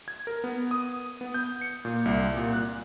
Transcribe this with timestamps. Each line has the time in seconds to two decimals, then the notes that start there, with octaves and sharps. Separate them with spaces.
0.08 G#6
0.27 A#4
0.44 B3
0.71 D#6
1.21 B3
1.34 G6
1.61 C#7
1.85 A#2
2.05 C2
2.37 A#2
2.53 F#6